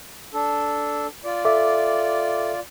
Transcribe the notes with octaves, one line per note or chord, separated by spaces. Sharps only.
D4 A4
F4 D5
A4 E5 D6